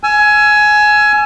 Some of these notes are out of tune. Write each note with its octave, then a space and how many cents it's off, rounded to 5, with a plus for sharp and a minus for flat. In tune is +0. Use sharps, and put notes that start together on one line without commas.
G#5 +20 E6 +35